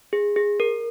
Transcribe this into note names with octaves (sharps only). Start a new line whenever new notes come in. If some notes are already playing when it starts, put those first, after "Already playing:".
G#4
G#4
A#4